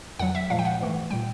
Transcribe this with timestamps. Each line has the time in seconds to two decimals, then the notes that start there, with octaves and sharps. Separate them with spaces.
0.19 F2 D3 F#3 F#5
0.35 E5
0.50 A#2 F3 G#3 F5
0.59 G5
0.65 F#5
0.80 G#2 E3 A3
1.11 A#2 G3 G5